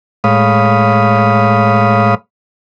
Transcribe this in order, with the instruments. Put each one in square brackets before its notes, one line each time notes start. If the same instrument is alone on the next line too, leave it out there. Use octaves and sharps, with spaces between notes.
[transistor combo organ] A2 G#3 C#5 F5 B5 D#6